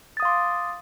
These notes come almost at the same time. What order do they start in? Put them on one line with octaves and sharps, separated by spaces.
A6 D#6 F5 C6 D6